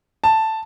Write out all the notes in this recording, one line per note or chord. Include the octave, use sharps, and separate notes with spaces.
A5